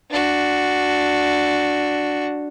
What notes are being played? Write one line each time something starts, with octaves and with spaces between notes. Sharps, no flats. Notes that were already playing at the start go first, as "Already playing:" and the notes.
D4 F#4